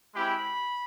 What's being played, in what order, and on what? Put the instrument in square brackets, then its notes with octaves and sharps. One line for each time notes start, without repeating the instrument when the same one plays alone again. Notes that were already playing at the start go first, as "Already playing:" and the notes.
[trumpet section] G#3 C4 E4 G4 B5